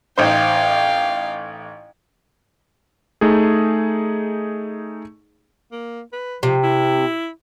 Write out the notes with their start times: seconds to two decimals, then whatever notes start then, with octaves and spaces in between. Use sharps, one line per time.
0.18 A1 D#4 C5 F5 G5
3.21 A3 D#4 G#4
5.72 A#3
6.13 B4
6.43 C3 F3
6.63 E4